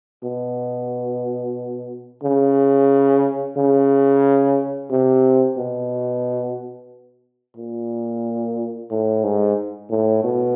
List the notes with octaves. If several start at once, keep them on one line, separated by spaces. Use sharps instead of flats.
B2
C#3
C#3
C3
B2
A#2
A2
G#2
A2
B2